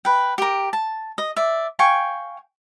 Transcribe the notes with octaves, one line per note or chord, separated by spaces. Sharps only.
B4 G5
G4 A#4
A5
D#5
D5 E5
F5 G5 G#5 C#6